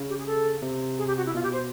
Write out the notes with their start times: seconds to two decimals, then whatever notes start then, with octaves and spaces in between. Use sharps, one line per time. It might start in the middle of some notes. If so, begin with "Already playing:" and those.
Already playing: C#3
0.09 G4
0.18 G#4
0.26 A4
0.62 C3
0.98 G#4
1.07 G4
1.17 F#4
1.26 E4
1.34 B2 F4
1.43 G4
1.52 C5